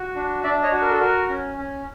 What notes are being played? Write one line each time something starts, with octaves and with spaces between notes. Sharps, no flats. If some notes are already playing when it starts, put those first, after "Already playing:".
Already playing: F#4
D4
D4 D5 E5
C#5 D#5
F#4
A#4
A4
F#4 A#4
C#4
C#4